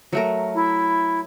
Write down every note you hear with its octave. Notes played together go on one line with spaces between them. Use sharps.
F#3 A3 A#4
E4